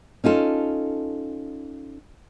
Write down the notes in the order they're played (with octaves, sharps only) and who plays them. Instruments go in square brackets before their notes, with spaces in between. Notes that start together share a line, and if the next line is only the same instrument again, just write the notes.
[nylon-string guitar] C#4 D#4 F4 A4